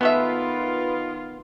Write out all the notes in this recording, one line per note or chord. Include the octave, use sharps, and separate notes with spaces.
D#3 G#3 A3 B3 F4 B4 E5